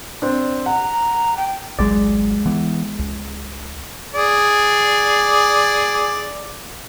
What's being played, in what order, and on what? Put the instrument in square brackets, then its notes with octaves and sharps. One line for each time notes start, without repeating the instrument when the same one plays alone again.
[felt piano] C4 D4
[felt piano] F#5 [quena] A#5
[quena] G5
[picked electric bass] G#1 C#2 F#3 [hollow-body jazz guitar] G#3 D5
[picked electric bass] E3 B3
C#2
[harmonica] G#4 D5